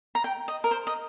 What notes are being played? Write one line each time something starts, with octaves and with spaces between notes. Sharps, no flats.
A#5
G5
D#5
A#4
C5
D#5